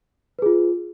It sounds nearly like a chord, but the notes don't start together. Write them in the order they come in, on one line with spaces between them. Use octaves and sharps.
B4 G#4 F4